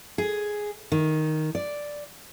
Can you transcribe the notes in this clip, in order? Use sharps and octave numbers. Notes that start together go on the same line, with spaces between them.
G#4
D#3
D5